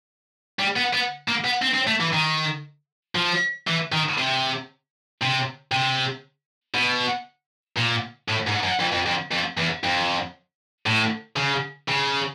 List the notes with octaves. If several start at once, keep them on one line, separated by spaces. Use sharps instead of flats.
G3
B3
B3
A#3
B3
C4
C4
A3
E3
D#3
F3
E3
D#3
C3
C3
C3
B2
A#2
A2
G#2
F#2
F2
F2
F2
F2
E2
F2
A2
C#3
C#3